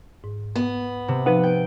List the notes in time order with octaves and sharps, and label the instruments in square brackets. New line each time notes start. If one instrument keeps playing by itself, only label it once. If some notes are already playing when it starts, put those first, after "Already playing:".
[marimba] G#2
[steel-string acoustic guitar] B3
[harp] C3
[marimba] F3 D#4 [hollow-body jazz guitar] B4 F#5
[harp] G5 D7